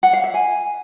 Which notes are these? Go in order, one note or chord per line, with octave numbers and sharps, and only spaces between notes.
F#5
F5
E5
G#5